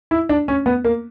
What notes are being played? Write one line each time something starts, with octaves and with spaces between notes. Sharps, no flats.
E4
D4
C#4
B3
A#3